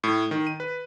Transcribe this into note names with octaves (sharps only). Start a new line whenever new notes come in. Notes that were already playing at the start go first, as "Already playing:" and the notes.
A2
D#3
D#7
B4